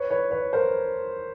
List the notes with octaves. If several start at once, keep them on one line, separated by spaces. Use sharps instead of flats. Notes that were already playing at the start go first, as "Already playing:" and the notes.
Already playing: B4 C#5
B4 C#5
B4 C#5
A#4 C5